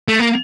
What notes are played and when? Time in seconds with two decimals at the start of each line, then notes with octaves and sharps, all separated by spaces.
0.08 A3
0.19 A#3